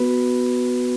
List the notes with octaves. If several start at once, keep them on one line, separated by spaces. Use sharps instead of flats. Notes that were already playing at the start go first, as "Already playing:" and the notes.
Already playing: B3 F#4 B4